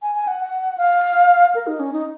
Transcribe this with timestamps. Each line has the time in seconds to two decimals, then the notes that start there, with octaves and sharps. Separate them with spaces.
0.02 G#5
0.15 G#5
0.28 F#5
0.40 F#5
0.78 F5
1.55 A#4
1.67 D#4
1.80 C#4
1.93 D#4